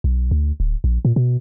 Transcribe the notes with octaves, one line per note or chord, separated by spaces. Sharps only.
B1
D2
D1
A#1
A#2
B2